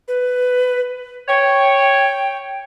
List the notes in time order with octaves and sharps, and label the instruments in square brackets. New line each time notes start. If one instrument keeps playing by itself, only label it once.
[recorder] B4
[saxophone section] C#5 [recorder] G5